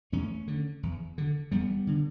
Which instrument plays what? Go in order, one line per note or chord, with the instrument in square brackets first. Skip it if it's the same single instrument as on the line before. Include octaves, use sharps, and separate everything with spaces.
[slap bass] E2 A3 C#4
D3
E2
D3
E2 G3 B3
D3